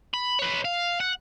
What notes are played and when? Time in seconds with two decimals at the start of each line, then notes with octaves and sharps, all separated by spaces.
0.14 B5
0.39 B4 C#5
0.65 F5
1.00 F#5